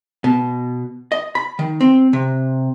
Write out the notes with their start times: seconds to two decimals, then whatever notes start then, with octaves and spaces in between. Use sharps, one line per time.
0.24 B2
1.12 D#5
1.35 B5
1.59 D#3
1.81 C4
2.13 C3